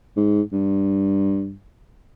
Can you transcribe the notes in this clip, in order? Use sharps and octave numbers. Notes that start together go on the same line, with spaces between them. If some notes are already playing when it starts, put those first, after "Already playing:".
G#2
G2